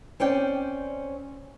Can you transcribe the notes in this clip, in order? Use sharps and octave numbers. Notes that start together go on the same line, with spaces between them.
C4 C#4 D5 G5